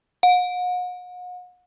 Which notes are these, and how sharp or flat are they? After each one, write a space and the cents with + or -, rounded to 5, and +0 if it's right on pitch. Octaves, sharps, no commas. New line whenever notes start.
F#5 -40